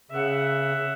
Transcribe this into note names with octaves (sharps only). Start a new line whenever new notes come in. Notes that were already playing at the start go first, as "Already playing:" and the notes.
C#3 E5 F#5